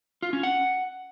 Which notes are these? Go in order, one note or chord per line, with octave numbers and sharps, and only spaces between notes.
F4
C#4
F#5